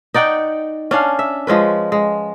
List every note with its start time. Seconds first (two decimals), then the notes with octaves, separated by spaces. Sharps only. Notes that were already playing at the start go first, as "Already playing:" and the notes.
0.14 D#4 D5 F#5 G5
0.91 C#4 D4 F5
1.19 E5
1.47 F3 G#3 C#4 B4
1.92 G#3